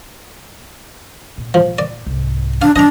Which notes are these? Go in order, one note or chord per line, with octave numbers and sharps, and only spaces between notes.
A#2
F3
D5
C2 G#2
D4 F5
F3 D4 D#5 A#5